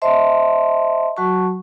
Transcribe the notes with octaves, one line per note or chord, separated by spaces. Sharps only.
C5 D#5 E5 A5 C6
F#3 F#4 A5 C#6